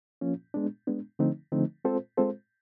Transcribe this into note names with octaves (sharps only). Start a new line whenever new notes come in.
F3 A#3 C#4 F4
G#3 B3 D4
G#3 B3 D4
D3 F3 A3 C4 D#4
D3 F3 A3 C4 D#4
G#3 C4 F4 A4 C5
G#3 C4 F4 A4 C5